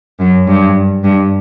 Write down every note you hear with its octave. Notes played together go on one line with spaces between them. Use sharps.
F#2
G2
G2